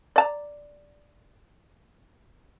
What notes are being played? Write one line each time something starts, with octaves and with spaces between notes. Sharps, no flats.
D5 A5 A#5